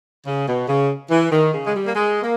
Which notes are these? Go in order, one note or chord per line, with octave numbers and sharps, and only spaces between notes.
C#3
B2
C#3
E3
D#3
C#3
G#3
G3
A#3
G#3
A#3